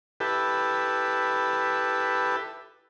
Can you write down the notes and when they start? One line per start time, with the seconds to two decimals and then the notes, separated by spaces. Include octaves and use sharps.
0.20 E4 G4 A4 B4